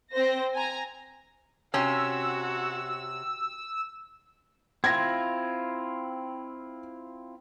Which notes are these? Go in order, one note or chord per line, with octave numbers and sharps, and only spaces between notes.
C4 C5 A#6
G#5 A#5
C3 C#4 F#4 E6
C4 E4 F4 G#6 A#6